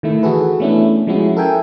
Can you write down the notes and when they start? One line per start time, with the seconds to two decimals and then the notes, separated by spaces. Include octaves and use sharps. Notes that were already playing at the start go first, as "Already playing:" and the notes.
0.03 D#3 A3 E4
0.23 E3 F#4 G#4 A4 B4
0.60 A3 B3 C#4 D4 E4
1.07 F3 G#3 C#4 E4 F#4
1.37 A4 A#4 E5 G5 G#5